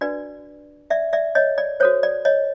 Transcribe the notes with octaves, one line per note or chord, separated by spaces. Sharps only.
D4 F#4 B4 D5
D5 E5
D5 E5
C#5 D#5
D5
F#4 A4 C5 C#5
D5
C#5 D#5